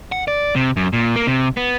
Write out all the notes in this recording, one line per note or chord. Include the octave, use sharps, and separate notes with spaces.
F#5
D5
C3
F#2
A#2
A#3
C3
B3